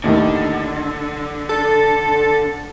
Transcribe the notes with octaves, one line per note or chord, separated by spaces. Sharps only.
D#2 A2 D3 D#3
A4